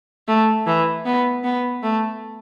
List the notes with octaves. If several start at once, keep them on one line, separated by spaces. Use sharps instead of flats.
A3
E3
B3
B3
A3